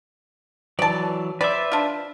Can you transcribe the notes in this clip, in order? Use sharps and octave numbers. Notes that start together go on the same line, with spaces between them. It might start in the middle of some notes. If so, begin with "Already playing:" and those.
E3 F#3 D5 A5
B4 C5 D5 E5
D4 F4